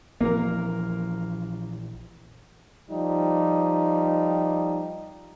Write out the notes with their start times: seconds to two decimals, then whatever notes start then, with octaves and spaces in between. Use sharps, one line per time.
0.21 A#1 E3 F3 A#3 A#4
2.91 F3 G3 D#4